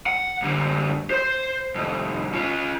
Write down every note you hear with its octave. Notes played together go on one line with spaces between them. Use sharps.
F#5
F#2 D3
C5 C6
C2 F2
C#4 F4